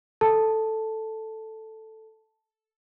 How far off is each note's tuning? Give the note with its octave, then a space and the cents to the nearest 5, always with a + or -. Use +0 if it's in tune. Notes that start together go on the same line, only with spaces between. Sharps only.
A4 +0 A5 +0